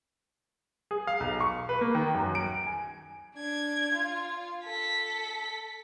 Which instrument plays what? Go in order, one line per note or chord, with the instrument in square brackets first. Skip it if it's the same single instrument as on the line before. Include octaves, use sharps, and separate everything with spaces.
[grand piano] G#4
F5
B1
C#6
B4
A#3
D#3
F#2
D7
G#5
[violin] D4 G#6
F4
A4 B6